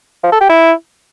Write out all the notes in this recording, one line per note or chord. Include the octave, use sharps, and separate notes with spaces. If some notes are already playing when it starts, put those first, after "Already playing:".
F3
A4
G4
E4